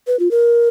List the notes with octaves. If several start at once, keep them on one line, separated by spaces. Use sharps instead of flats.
B4
F4
A#4